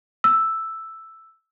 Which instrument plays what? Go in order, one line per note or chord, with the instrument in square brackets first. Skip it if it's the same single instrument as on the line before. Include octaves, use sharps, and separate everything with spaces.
[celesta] E6